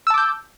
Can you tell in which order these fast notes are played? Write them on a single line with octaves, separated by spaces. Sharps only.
E6 A5 D6 G6